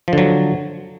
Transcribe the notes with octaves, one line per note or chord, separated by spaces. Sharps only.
D3 F3 F#3